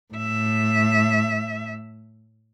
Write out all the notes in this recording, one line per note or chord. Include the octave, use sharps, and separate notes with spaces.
A2 E5